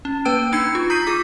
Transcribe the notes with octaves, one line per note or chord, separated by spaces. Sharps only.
C#4
A#3 B4 G5 E6 D7
D4 D#4 E6 G#6 C7 C#7
F4
A#5 D#6 G6 B6 C7 D#7
F4 G#4 D6 B6